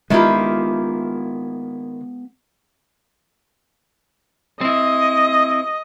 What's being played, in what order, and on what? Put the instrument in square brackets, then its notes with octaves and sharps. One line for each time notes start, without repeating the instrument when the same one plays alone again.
[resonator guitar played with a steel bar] D#3 E4 [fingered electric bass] G#3 B3 [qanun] A#3 F4 G4
[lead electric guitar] C4 E4 [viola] D#5